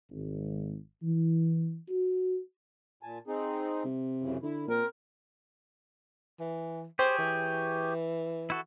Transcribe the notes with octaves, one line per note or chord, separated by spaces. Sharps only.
G#1
E3
F#4
A#2 G#5 A5
C4 D#4 G#4
C3
F#2 C#3 E3
D3 E4
A#2 C4 A#4
E3
G4 G#4 C5 C#5
E3
E4 F#4 A4